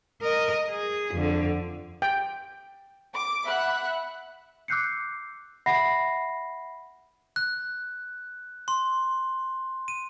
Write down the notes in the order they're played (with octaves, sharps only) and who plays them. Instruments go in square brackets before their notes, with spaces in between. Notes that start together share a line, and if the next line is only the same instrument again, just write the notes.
[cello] A#4 D#5
G#4
F2 D3
[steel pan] G5
[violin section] D6
E5 F#5 B5 F#6
[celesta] D6 E6 F#6 G6 C7 C#7
E5 F#5 B5 A#6 C7
[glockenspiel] F#6
C6
D#7